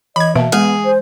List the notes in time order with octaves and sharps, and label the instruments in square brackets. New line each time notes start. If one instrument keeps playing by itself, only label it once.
[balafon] E3 [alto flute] D#5 [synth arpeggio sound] B5 G#6
[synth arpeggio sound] B2 [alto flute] A#3 [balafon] E5 A5
[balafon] G#3 [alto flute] B3 [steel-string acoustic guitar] G#4 [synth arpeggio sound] F6
[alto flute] C5